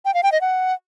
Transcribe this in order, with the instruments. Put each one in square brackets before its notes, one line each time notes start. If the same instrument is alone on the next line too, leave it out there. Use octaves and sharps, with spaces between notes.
[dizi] G5
F5
G5
D#5
F#5